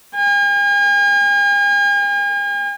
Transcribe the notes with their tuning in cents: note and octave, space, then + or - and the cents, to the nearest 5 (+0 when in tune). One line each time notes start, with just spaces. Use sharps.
G#5 -45